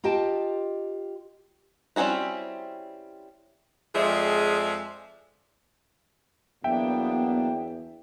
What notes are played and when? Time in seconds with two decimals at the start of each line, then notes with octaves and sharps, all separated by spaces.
0.04 F4 G4 D#5 G5 A5
1.96 G3 C4 C#4 E4 F#4
3.95 F2 F3 G#3 G#4 D5 E5
6.64 E2 F#3 A#3 B3 D4 E5 G5